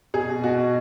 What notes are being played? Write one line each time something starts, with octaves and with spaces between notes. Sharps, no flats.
B2 G#4
B2
B2 F#4
B2